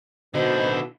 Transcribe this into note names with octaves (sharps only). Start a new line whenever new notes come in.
B2 D3 D#4 E4 C5